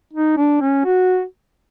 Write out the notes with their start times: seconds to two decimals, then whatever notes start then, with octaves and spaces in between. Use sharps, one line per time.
0.13 D#4
0.37 D4
0.61 C#4
0.85 F#4